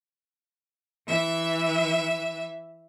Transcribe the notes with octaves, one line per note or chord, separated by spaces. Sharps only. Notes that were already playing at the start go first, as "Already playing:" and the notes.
E3 E5